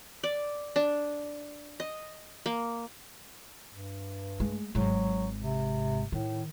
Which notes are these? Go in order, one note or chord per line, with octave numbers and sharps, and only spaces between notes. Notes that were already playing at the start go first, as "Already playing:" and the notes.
D5
D4
D#5
A#3
G2
G#3
G#1 G#2 F#3
C3
A2 D#3